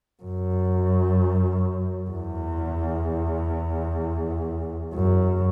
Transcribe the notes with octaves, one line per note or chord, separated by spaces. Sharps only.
F#2
E2
F#2